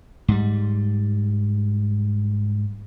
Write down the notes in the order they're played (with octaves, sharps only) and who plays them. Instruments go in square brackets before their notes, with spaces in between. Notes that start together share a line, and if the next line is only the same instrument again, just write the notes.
[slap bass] G#2 G3